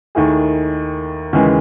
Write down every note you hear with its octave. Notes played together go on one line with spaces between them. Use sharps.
D#2 D#3 A3 E4 G#4
D#2 C#3 E3 G#3